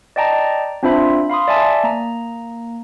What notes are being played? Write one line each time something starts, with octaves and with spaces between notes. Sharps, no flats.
D5 D#5 G5 A5 A#5
C4 D4 F4 C5 E5 B5
F5 B5 C6 D#6
D5 E5 G#5 A5
A#3 A#5